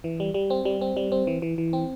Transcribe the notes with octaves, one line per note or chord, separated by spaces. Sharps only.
E3
G3
G3
C4
G3
C4
G3
C4
E3
E3
E3
C4